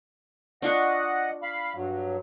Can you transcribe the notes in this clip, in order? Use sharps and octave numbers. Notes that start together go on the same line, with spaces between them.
D4 F4 D#5 F#5 C#6
F5 B5
G2 F#3